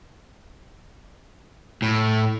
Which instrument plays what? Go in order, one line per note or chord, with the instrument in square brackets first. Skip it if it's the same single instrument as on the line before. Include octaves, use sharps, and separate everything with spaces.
[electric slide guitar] A2